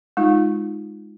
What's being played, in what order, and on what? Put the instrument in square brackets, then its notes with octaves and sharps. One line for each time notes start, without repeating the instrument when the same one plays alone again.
[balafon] G#3 D#4 F4